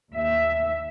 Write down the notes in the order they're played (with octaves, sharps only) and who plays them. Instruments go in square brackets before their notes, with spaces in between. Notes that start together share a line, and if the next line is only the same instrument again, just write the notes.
[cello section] D#2 E5